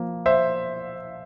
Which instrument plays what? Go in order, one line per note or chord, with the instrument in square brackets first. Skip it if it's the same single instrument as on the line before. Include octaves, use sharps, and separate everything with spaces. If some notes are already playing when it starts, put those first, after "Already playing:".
Already playing: [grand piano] F3 A#3
C5 E5